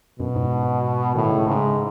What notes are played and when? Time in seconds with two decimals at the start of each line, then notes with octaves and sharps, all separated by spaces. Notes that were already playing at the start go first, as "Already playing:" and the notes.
0.19 F#2 B2
0.36 G#2
1.15 A2 D#3
1.31 C#3
1.47 G#2 C#3